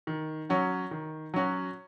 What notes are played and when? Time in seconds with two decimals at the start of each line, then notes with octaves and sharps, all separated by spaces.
0.07 D#3
0.49 F#3 C#4 F#4
0.91 D#3
1.34 F#3 C#4 F#4